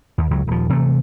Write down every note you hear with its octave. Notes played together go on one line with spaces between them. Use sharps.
D#2
C#2 F#3
D#1 F3
C3 E3 F#3 A3